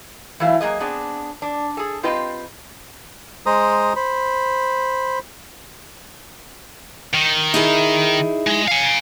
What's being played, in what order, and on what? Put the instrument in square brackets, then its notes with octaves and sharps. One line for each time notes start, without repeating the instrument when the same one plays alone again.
[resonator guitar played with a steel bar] E3 F#3 A3 E4 F5
F#3 A#3 B3 G#4 D#5
B3 C4 D4 G#4
D4
G#4 A4
C4 F4 G4 B4 D#5 G5
[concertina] G#3 C5 A#5 D#6
C5 B5
[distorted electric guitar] D#3
[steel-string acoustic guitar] D#4 E4 G#4
[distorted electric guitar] G#3
F5 G#5